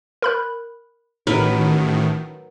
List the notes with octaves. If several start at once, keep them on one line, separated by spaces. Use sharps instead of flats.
A#4 B5 F#6
A1 A2 D#3 F#3 A#4 B4 A#5 F6